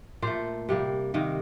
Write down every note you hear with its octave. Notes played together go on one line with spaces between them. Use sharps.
A#2 A3 C5
C3 G3 A#3
C3 D#3 A#3